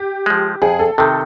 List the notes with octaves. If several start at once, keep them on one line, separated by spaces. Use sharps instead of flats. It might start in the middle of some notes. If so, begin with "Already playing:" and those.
Already playing: G4
F3 G#3
F2 G#4
A4
C3 D#3 A4